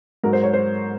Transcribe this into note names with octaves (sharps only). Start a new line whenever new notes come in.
G#2 F#3 A#4
C5
C#5
C5